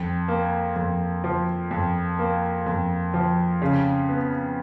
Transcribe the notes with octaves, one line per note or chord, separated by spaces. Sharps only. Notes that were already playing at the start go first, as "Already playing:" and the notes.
Already playing: F2
A#3
F2
F3
F2
A#3
F2
F3
C#3
B3